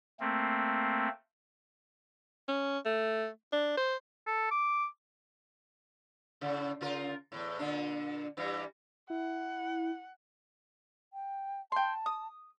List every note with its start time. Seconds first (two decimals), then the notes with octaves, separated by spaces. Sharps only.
0.20 A3 A#3 C4
2.48 C#4
2.86 A3
3.53 D4
3.77 C5
4.27 A4
4.51 D6
6.41 A2 C#3
6.81 C#3 F4 A#4
7.32 E2 A2
7.59 A#2 D3 D4
8.37 G2 E3 G3
9.10 E4 F#5
11.13 G5
11.72 G5 A5 C6
12.06 D#6